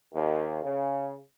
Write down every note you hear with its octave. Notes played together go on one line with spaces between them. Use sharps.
D#2
C#3